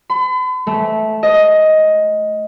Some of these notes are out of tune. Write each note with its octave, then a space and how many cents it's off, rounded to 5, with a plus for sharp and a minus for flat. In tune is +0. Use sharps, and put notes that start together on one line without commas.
B5 +45
A3 -15
D#5 +10